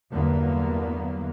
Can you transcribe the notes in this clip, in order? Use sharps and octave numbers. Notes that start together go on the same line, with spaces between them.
E2 G2 D3 F#3 A#3 B3